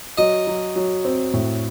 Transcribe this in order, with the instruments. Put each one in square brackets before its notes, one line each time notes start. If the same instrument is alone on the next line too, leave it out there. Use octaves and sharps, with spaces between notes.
[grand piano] F#3 [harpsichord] D#5
[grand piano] F#3
F#3
C4
A2